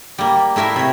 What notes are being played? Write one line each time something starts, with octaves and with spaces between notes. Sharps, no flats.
G3 A#3
A3 E4 A#4 E5 F5
C3 C#5